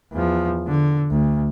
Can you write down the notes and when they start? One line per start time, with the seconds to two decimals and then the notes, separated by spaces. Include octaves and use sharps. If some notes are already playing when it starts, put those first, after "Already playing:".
0.13 E2 F3
0.67 D3
1.10 D2